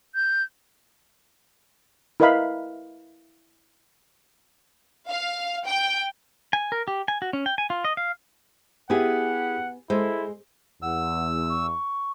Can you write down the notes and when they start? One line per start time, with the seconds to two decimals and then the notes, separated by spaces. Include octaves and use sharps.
0.15 G6
2.20 E4 A#4 B4 D#5 F5 B5
5.09 F5
5.65 G5
6.53 G#5
6.72 A#4
6.88 G4
7.08 G#5
7.22 F#4
7.33 C#4
7.46 G5
7.58 G#5
7.70 F4
7.85 D#5
7.97 F5
8.90 B3 E4 G4 G#4 F#5 G#5
9.90 G#3 E4 A4 C5
10.82 E2 F#5 E6
11.50 C#6